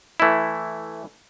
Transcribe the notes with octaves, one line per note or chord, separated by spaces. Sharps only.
E3 A3 E4